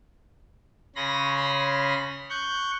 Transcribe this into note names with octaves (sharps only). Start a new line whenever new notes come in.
C#3 C#4 B5 C6 A#6
C#6 F#6 G6